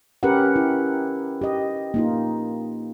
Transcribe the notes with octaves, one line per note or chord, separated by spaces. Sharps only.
C#4 G4 A#4 B4 F#5
E4
G4 D#5
A#3 D#4 F4